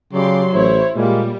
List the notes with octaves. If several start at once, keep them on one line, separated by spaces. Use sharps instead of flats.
C#3 F#3 G4 D5 C6
A1 E4 C5 C#5
A#2 G3 G#3 A#3